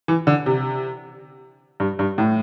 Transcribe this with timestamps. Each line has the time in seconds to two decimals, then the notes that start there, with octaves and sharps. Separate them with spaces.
0.08 E3
0.27 D3
0.46 C3
1.80 G2
1.99 G2
2.18 A2